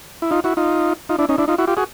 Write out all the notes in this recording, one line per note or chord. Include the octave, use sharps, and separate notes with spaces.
E4
D#4 F4
E4 F#4
D#4 F4
D#4 F4
D4 E4
C#4 D#4
D4 E4
D#4 F4
E4 F#4
F4 G4
F#4 G#4